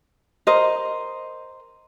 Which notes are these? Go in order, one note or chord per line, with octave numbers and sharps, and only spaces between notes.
A#4 C5 D#5